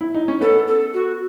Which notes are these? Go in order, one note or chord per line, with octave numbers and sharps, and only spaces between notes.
E4
D#4
C#4
B3 A4
A4
F#4